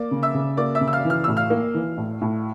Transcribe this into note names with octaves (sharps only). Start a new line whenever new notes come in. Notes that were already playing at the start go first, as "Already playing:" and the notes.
Already playing: A#3 D5 D6
C#3
E5 E6
C#3
A#3 D5 D6
E5 E6
C#3
E6
F5 F6
E3
F6
A2 E6
F5 F6
A#3
E3
A2
A2